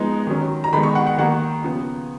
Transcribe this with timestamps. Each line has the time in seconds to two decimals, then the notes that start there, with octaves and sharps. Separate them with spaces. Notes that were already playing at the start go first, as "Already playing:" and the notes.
Already playing: F3 G#3 B3 D#4 A#5
0.27 D#3 F#3 C#4
0.64 A#5
0.73 D#3 G#3 B3 D#4 B5
0.83 C#6
0.95 F#5
1.07 F#5
1.18 D#3 A#3 D#4 F#5
1.64 C#3 F3 B3